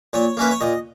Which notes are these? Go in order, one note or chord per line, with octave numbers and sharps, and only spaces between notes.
A#2 C#5
A#3 C#4 E4 B4
C#5
A#2 D#5